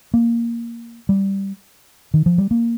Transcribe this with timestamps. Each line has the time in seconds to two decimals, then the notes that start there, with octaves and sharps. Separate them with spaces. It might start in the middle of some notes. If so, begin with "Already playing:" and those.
0.14 A#3
1.09 G3
2.14 D#3
2.26 F3
2.38 G3
2.51 A#3